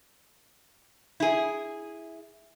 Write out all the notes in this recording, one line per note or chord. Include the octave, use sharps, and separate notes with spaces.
E4 G#4